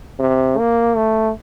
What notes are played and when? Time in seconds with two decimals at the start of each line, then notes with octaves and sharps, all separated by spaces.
0.19 C3
0.58 A#3
0.97 A3